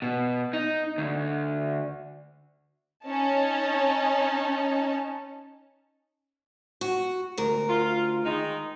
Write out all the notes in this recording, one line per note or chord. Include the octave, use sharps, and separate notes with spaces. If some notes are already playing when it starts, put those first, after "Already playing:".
B2
D#4
D2
C#4 D#4 A5
F#4
D2 A#4
F4
D#3 G#3 D#4